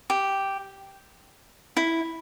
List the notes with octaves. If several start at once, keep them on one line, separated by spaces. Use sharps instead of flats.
G4
E4